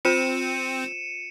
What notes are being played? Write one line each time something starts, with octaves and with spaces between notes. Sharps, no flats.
C4 F4 C5 C#7 D#7 E7